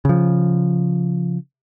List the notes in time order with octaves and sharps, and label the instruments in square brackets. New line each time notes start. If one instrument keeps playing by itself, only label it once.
[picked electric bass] C#3 F3